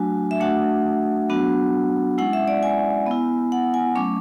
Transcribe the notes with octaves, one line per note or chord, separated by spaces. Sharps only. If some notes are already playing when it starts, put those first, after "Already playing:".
Already playing: F#3 A3 D4 F#4 G#5
E5
A3 D4 F#4 F#5
F#3 B3 D4 F#4
G#3 C#4 E4 F#5
E5
D5
G#5
B3 E4
F#5
G#5
F#3 A3 C#4 D6